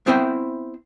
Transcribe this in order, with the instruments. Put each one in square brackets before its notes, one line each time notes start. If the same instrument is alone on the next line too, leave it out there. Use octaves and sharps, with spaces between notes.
[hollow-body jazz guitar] B3 C4 E4 C5 E5 G5